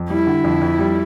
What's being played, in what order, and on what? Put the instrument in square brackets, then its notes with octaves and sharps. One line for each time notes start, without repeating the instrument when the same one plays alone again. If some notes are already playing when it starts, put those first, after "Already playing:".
Already playing: [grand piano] F2
[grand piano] G3 [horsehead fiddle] E4
[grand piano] D3
F2
F2
G3